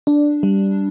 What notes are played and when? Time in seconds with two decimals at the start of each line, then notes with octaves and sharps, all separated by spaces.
0.07 D4
0.43 G3